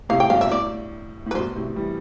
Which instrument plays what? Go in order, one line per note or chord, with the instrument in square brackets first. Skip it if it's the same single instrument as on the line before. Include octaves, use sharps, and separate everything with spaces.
[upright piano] A2 C3 [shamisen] F5
[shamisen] G5
[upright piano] G2 B2 [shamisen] F5
[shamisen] E5
[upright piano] B2
[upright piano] A2 [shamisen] D5
[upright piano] A2
[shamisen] B4
[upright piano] G2 B2 [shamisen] C5
[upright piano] A2 C3
E3 G3